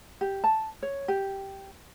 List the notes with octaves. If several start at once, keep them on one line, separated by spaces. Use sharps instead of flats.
G4
A5
C#5
G4